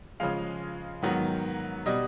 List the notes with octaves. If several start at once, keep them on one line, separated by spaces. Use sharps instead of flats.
C#3 F3 G#3 F5
G#2 D#3 F#3 B3
B2 G3 D#5